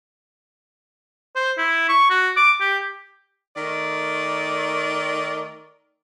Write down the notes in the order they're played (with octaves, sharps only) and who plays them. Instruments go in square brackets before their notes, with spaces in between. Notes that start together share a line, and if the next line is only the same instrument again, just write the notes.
[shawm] C5
E4
C#6
F#4
D6
G4
[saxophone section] D#3 A3 A#4 D5